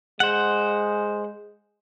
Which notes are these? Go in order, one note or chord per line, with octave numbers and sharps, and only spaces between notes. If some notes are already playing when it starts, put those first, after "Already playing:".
G#3 C5 F#5